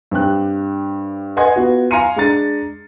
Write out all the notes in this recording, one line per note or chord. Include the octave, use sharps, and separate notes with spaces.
G2 C4 G4 F#6
B4 D#5 F#5 G#5 C6 G#6
B3 F4 F#4
F5 G#5 A#5 C6 C#7 D#7
G#3 D4 A#5 A6